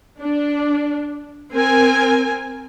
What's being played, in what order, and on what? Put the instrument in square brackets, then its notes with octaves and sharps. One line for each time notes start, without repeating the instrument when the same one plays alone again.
[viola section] D4
C4 A#4 G#5